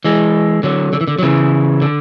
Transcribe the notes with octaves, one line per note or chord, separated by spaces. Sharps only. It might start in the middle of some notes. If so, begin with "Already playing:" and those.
E3 G#3
D3 F#3
D3
E3
D3
F#3
C#3 E3
D3